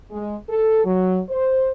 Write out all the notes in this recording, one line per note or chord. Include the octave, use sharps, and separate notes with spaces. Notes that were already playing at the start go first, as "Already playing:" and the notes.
G#3
A4
F#3
C5